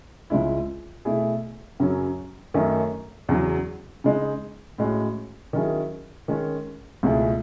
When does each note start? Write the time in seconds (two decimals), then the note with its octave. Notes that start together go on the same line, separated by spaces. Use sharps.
0.30 C#2 C#3 G#3 C#4 E4
1.05 B2 A3 E4 G#4
1.80 F#2 C#3 F#3 C#4
2.54 F#2 D#3 A3 C#4
3.29 E2 C#3 F#3
4.04 C#3 G#3 D#4
4.78 A2 G#3 C#4 F#4
5.53 D#3 F#3 C#4 E4 G#4
6.28 D#3 G#3 C#4
7.03 C#2 B2 A3 E4 G#4